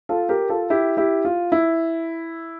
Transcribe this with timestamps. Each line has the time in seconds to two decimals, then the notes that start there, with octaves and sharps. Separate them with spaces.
0.09 F4 A4
0.29 G4 A#4
0.50 F4 A4
0.70 E4 G4
0.97 E4 G4
1.25 F4
1.52 E4